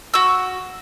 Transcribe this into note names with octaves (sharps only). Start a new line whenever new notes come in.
F#4 E6